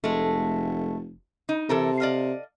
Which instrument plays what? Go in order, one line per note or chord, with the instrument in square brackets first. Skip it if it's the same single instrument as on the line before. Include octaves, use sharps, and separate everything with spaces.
[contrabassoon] F1 [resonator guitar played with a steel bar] G#3 A3
[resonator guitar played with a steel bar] D#4
[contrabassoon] C3 [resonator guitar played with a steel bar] E3 A4 A#4
[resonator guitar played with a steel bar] D5 D#5 F5